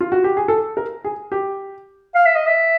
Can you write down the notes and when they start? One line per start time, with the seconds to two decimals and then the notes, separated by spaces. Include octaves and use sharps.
0.01 F4
0.12 F#4
0.24 G4
0.37 G#4
0.48 A4
0.77 A#4
1.04 G#4
1.32 G4
2.15 F5
2.26 E5
2.36 D#5
2.47 E5